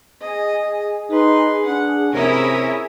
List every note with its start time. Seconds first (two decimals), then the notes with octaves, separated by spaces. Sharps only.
0.21 G#4 D#5
1.10 D#4 B4 C6
1.66 D4 F#5
2.13 C3 C#4 E4 A#4 C#5 D#6